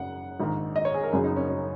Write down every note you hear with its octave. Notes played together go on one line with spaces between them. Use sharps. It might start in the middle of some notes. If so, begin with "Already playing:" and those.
Already playing: F#1 F#2 C#3 F#5
A#1 G#2 D#3
D#5
C#5
G#4
A#4
F#1 F#2 C#3 G#4
D#4
C#4
C#4